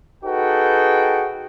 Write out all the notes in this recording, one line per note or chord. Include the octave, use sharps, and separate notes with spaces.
D#4 F#4 G#4 A4 B4 G5